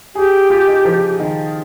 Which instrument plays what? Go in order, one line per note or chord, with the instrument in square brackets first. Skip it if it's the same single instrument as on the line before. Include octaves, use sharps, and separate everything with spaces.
[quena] G4 [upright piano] G#4
[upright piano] F4
D#4
F3
D#3